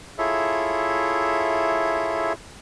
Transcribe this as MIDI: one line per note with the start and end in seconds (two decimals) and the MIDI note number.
0.18 2.33 64
0.18 2.33 65
0.18 2.33 68
0.18 2.33 69
0.18 2.33 73
0.18 2.33 76